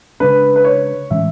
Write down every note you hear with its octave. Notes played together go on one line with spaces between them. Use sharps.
C#3 G#3 D4 B4
B4
C#5
A2 E3 G#3 C#4 E5